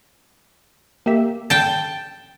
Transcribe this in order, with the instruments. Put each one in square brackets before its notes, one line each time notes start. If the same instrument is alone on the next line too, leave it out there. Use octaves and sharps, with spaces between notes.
[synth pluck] A#3 G4 E5
[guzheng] G5 A5